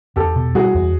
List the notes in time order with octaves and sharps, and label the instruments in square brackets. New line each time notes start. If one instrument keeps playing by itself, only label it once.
[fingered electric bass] E2 [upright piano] G4 A4
[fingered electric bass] B2
[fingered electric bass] G3 [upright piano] F#4 G#4
[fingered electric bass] E2